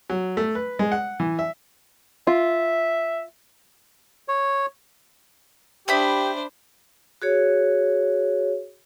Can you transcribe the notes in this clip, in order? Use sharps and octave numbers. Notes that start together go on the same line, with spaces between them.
F#3
A3
B4
G#3
F#5
E3
E5
F4 E5
C#5
D4 G4 C5 E5 G5 B5 D#6
F#4 G#4 C#5